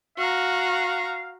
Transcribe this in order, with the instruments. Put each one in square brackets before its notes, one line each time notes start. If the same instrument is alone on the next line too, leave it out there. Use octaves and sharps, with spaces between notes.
[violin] F#4 A#5 [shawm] F5